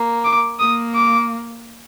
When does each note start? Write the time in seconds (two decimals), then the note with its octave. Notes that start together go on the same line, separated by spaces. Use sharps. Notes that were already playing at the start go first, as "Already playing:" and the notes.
Already playing: A#3
0.25 D6
0.59 A#3 D#6
0.95 D6